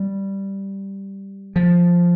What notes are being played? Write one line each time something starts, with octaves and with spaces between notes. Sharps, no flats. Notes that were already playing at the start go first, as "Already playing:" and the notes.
Already playing: G3
F3